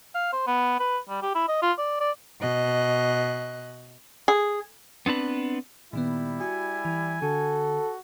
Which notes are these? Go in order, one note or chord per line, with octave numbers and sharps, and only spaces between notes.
F5
C5
B3
B4
G3
G4
E4
D#5
F4
D5
D5
B2 D#5 F#6
G#4
B3 C4 D4 B4
A#2 D#3 G3 B3 E4
F#4 G#5
E3
D3 F#4 A4